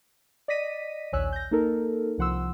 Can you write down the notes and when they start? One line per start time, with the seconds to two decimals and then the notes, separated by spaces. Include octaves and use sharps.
0.48 D5 D#5 A#6 B6 D#7
1.12 A#1 D#2 C#5 G#5 E6 F#6
1.33 G6 A#6
1.51 A#3 D#4 A4 A#4
2.18 C2 F3 F#5 C6 E6